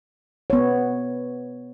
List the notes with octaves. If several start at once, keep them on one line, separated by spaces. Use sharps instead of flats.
B3 C#5